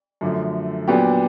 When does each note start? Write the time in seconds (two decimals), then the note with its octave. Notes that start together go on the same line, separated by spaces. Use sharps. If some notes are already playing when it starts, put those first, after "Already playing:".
0.21 F#2 D3 F3 A3
0.88 A#2 F#3 B3 D4 G4